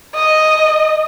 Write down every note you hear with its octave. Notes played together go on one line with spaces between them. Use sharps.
D#5